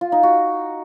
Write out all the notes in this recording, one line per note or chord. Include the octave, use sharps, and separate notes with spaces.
F4
D#4
F#4